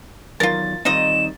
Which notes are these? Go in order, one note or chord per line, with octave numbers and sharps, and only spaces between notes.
E2 D#3 F#3 F4 A#4 A6
D#3 G3 C4 D#4 F4 D#5 E7